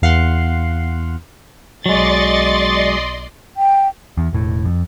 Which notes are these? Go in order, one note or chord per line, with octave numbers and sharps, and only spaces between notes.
E2 F5 F#5 C6 F#6
B1 F#3 G#3 D5 D#5 C6 C#6 A6
G5
E2
E1 A2
F2